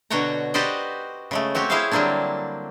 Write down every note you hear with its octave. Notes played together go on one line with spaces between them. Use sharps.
B2 D3 F#4 C#5 G5 A#5
F#4 G4 B4 C5 D5 D#5
C#3 G#3 A3
C4 F#4 G4 C#5
E4 G#4 C5 C#5 E5 F5
D3 F#3 G3 A#3 C4 D4